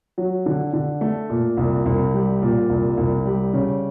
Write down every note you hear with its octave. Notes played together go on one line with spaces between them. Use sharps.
F#3
D3
D3
A3
A#2
C2
C2
G3
A#2
C2
C2
G3
C#3